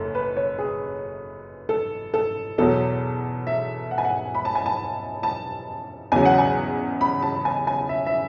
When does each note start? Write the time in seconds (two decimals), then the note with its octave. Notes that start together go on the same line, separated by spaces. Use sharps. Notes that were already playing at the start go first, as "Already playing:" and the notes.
Already playing: F#1 F#2 A4 C#5
0.15 B4
0.37 C#5
0.58 G#4
1.69 A4
2.14 A4
2.58 E2 B2 F#3 A4
3.47 E5
3.91 F#5
3.98 G#5
4.05 F#5
4.35 B5
4.45 A5
4.55 G#5
4.66 A5
5.23 A5
6.12 E2 C#3 F#3 G#5
6.25 F#5
6.38 G#5
7.01 B5
7.22 A5
7.45 G#5
7.67 G#5
7.89 E5
8.06 E5